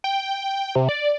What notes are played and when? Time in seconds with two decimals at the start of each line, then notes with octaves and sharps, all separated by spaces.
0.04 G5
0.75 C3
0.89 D5